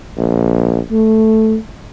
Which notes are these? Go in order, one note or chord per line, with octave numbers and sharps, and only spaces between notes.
A#1
A3